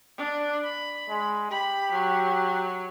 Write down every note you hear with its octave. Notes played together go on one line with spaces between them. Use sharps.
D4
B5
G#3
G4 B5
F#3